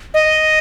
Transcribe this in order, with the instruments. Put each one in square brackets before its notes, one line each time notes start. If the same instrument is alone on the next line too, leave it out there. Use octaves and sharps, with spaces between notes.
[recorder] D#5